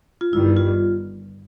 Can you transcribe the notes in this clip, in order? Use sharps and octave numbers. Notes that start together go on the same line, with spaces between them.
F4
G1 G2 D#3 G3 E4
F4